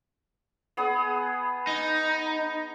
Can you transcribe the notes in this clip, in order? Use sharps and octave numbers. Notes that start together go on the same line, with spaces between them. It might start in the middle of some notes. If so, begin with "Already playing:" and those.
B3 G#4 D#6
D#4